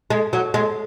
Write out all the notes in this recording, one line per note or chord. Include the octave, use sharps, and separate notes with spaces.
G#3
F#3
G#3